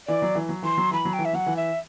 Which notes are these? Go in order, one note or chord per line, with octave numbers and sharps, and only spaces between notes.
E3 D5
F#3
E3
F#3
E3 C6
F#3
E3 B5
F#3
G5
E3
E5
F#3 F#5
E3
E5